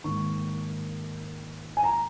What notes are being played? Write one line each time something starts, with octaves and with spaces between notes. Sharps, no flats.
G#2 D#3 A#3 C#6
G#5
A#5